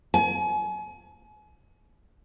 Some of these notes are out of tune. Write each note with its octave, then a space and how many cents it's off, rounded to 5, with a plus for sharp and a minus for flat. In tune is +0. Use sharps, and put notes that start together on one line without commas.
G#5 +35